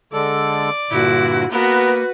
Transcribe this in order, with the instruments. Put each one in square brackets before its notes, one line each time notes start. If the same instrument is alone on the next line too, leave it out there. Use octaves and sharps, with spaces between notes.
[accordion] D3 G#3 A4 [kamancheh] D5
[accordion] G2 A#2 D3 [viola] E4 F#4
[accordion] A#3 [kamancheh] B3 A#4 [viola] F#4 B4